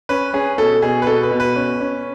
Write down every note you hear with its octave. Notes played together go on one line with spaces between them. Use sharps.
C#4 B4
C#4 G#4
B2 A4
B2 G#4
B4
B2 A4
B4
B2
B4
C#4
C#4